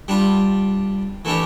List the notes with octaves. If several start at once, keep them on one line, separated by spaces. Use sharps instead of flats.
G3 D4 F4
E3 A3 D4 G4